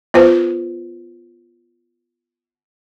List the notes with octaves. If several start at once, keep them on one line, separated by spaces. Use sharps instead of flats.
B3 F4 B4 C5